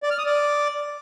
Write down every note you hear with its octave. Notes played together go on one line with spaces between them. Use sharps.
D5
F6
D#6
D5